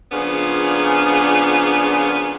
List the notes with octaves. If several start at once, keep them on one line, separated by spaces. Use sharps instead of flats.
A#2 C#3 F3 B3 D4 G#4